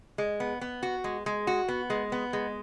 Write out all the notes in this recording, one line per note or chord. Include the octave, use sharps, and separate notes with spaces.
G#3
B3
B3
F#4
G#3
G#3
F#4
B3
G#3
B3
G#3